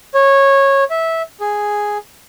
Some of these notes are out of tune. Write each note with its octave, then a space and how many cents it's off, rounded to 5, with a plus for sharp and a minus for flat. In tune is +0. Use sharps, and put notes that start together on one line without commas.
C#5 -15
E5 -15
G#4 +0